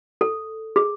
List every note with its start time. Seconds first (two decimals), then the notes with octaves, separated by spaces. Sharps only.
0.21 A4
0.76 G#4